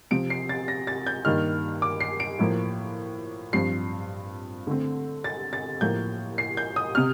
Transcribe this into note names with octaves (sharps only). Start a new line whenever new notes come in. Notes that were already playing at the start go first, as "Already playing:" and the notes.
C3 F3 C4 D7
C7
A6
A#6
A6
G6
G2 D#3 A#3 F6
D6
C7
D7
A2 F3 A#3
G2 F3 C4 C7
D3 A3 C4
A6
A6
A2 F3 A#3 G6
C7
G6
D#6
C3 F6